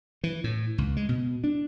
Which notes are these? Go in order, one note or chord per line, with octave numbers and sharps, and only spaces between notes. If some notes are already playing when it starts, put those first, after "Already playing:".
E3
A2
C#2
G#3
B2
D4